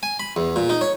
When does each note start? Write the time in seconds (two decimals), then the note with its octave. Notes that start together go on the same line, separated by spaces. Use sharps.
0.03 G#5
0.20 B5
0.36 E2
0.56 A#2
0.70 D#4
0.81 C#5